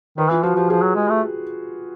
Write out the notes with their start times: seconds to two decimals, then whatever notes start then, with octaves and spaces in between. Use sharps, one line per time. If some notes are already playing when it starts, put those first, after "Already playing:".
0.18 D#3 B4
0.30 E3 F4
0.43 F3 F#4
0.56 F3 G4
0.70 F3 G#4
0.82 F#3
0.96 G#3
1.09 A3